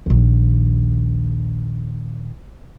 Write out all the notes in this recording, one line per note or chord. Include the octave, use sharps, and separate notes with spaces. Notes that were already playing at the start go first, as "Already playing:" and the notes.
A#1 D#2